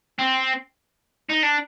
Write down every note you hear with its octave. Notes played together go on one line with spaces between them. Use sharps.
C4
D#4
D4